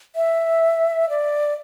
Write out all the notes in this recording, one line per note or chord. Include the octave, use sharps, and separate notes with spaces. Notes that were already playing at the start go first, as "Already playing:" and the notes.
E5
D5